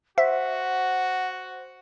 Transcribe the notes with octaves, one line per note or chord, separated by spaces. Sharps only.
F#4 C5 E5 F#5